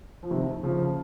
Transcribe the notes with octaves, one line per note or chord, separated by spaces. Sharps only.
F3
C3 D#3
C#3 F3